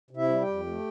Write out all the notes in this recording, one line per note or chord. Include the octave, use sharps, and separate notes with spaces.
C3
E4 E5
G3
G4 G5
F2
A3